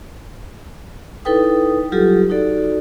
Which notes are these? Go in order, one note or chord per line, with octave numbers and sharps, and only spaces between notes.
D#4 E4 A4 B4 G5 D#6
F#3 G3 F4 G4 A4
D#4 F#4 A4 D5